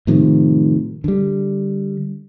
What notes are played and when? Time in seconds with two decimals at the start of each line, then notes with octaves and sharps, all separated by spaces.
0.07 A2 C3 D#3 F3
1.04 D3 G3